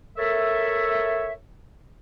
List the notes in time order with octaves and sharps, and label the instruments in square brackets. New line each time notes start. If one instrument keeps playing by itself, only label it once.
[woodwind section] A4 A#4 C#5 E5